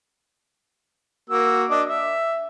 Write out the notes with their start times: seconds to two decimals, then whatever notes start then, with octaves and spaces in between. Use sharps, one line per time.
1.30 A#3 F#4 E6
1.70 D4 D#5 D6
1.88 E5